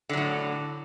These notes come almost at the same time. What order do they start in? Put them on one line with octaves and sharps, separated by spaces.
D3 F#3 A2